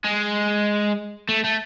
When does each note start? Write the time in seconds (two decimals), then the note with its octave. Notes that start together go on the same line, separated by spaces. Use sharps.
0.04 G#3
1.29 A3
1.44 A3